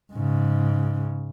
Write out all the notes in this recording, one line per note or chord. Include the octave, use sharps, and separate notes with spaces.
G#2 C#3